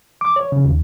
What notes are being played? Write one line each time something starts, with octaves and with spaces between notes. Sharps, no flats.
D6
C#5
C#3
D#2